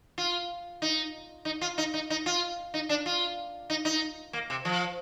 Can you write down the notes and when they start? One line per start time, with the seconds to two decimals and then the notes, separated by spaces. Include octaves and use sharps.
0.18 F4
0.82 D#4
1.45 D#4
1.61 F4
1.78 D#4
1.94 D#4
2.10 D#4
2.26 F4
2.74 D#4
2.89 D4
3.06 F4
3.70 D#4
3.85 D#4
4.33 A#3
4.50 C3
4.65 F3